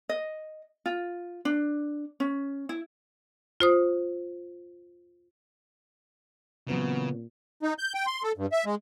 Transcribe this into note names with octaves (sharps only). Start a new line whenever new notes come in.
D#5
F4
D4
C#4
E4
F4 C5 D#6
A#2 C#3 E3 F#3 B3 C4
D#4
G6
G5
C6
A4
G2
E5
G#3